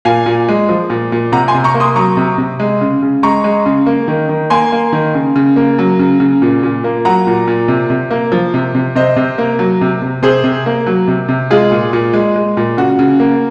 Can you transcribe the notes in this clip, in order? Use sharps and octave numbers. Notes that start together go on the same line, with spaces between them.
A#2 F5 G#5
A#2
G#3
F3
A#2
A#2
C3 F#5 A#5
G#5 C6
C3
A#5 C#6
A#3
C6 D#6
F#3 A#5 C#6
C3
C3
G#3
C#3
C#3
G#3 A#5 C#6
G#3
C#3
A#3
D#3
D#3
A#3 G#5 C6
A#3
D#3
C#3
C#3
A#3
F#3
C#3
C#3
A#2
A#2
A#3
F#3 F#5 A#5
A#2
A#2
C3
C3
A#3
F3
C3
C3
C3 C5 D#5
C3
A#3
F#3
C3
C3
C3 G#4 C5
C3
A#3
F#3
C3
C3
G#3 F4 G#4
A#2
A#2
G#3
G#3
A#2
C#3 F#4
C#3
A#3